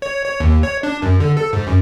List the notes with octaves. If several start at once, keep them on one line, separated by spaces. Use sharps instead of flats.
C#5
C#5
D#2
C#5
D4
F#2
D3
A4
G#2
F#2